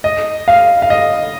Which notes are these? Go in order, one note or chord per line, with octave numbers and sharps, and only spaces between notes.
D#5
F5
F5
D#5